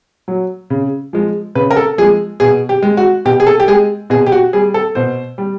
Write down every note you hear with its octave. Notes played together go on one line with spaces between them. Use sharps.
F#3
C#3
F3 G#3
C#3 B4
A#4
A4
F3 G#3 G#4
B2 G#4
G4
G#3
F#4
B2 G4
G#4
A4
G4
G#3 G#4
B2 G#4
G4
F#4
G3 G#4
A4
B2 C5
G3